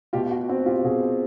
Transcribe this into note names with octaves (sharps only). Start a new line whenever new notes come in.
B2 F4 G4
F#4
C4 F#4
F4 G4
B2 F#4 G#4